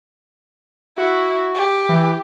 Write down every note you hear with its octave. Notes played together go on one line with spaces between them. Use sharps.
E4 F#4
G4
E3